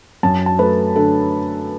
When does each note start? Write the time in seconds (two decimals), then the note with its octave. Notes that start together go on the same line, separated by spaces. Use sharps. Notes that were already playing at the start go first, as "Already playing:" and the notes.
0.23 F#2 A5
0.46 A5
0.59 A3 B4
0.96 D3 A4